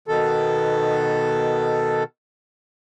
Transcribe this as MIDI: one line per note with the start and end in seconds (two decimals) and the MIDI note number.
0.08 2.04 47
0.08 2.04 51
0.08 2.04 69